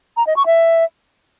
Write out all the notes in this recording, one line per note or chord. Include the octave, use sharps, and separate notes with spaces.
A#5
D#5
C#6
E5